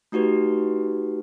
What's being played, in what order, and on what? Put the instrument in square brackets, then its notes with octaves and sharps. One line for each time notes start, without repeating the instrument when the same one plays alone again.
[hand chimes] A3 D#4 F#4 G4 B4